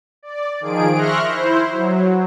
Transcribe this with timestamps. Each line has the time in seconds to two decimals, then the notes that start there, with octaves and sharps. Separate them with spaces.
0.23 D5
0.60 D#3 F3 G#4 D7
0.94 E5 C6 C#6 F6 F#6 A#6
1.26 E4 C5
1.72 F#3